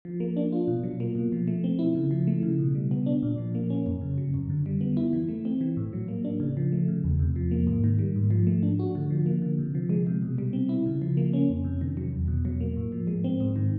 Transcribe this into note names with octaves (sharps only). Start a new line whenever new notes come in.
F3
A#3
D4
F4
B2
F#3
A#3
B2
F3
A3
C4
E4
C#3
F3
A3
C#3
B2
G3
B3
D4
A#2
F3
A#3
C#4
F#2
C#3
F#3
F#2
D3
G3
B3
E4
E3
A3
C4
E3
A2
F#3
A#3
D4
C#3
F3
A3
C#3
E2
C3
F3
A#3
G#2
D#3
G3
G#2
F3
A3
D4
F#4
D3
F3
A#3
D3
C3
F3
G#3
C3
B2
G3
C4
E4
C#3
F3
A#3
C#4
F2
C3
D#3
F#3
E2
B2
F#3
A#3
A2
F3
G#3
C4
G#2
D#3